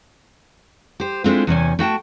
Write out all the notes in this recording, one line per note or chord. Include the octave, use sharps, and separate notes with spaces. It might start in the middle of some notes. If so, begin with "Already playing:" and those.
G4 C5
G#3 A3 C4 D4 E4 F4
E2 C3 C#4 G#5
A3 F#4 G5 A5